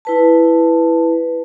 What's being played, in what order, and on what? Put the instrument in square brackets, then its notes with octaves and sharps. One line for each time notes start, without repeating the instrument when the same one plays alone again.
[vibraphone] E4 B4 A5